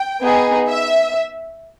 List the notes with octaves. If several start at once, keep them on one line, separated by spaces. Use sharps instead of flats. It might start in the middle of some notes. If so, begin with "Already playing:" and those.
Already playing: G5
B3 D#4 G#4
E5